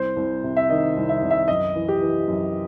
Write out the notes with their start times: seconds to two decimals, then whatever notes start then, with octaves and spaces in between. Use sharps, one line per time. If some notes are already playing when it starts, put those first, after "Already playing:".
Already playing: C2 C5
0.16 C2
0.43 C3
0.57 E5
0.69 D#3 D#5
0.96 C2
1.09 E5
1.22 C2
1.30 E5
1.48 F#2 D#5
1.75 E3
1.88 G4
2.02 E3
2.27 F#2